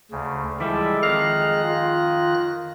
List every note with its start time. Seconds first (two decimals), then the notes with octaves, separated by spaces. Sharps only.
0.11 D2 C#3
0.60 E3 F3 G3 G#3 A4 D5 E5
1.03 F2 D#3 F5 F#6 A#6
1.64 F4